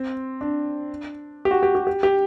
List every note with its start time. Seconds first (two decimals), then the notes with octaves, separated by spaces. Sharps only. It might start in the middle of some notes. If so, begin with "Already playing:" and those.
Already playing: C4
0.41 D4
1.45 G4
1.51 F#4
1.63 G4
1.75 G4
1.87 G4
2.03 G4